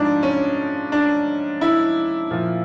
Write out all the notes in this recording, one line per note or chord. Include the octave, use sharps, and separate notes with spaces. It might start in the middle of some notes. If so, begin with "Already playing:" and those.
Already playing: G#2 F3 D4 D#4
C#4
D4
E4
A#2 F3